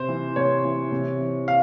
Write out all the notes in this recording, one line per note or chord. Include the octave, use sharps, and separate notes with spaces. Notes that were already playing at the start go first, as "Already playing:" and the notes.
Already playing: C3 C5
E3
C3 C#5
E3
C3
E3
F5